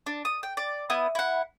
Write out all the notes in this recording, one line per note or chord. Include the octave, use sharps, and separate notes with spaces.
D4
D#6
G5
D5
B3 E4 D#6
E4 F#5